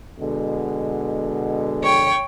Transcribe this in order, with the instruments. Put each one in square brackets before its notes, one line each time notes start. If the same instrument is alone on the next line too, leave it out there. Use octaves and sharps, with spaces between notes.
[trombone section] B2 D3 G#3
[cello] C#5 G5